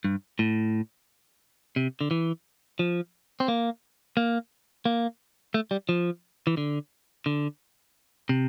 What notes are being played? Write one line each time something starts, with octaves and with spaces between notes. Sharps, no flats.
G2
A2
C3
D3
E3
F3
C4
A#3
A#3
A#3
A3
G3
F3
E3
D3
D3
C3